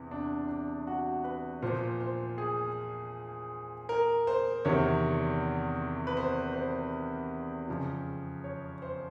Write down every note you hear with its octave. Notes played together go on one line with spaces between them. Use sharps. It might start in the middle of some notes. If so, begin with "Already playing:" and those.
Already playing: E2 C3
D4
D4
F#4
B4
A#2 F3 C5
C5
G#4
A#4
C5
E2 C3 D#3 C#5
B4
C5
C5
F2 C#3 F3
C#5
C5